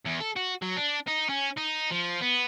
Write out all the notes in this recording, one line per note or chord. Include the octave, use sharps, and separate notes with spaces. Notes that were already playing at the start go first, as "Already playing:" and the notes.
E2
A4
F#4
F#3
D4
D#4
C#4
D#4
F3
B3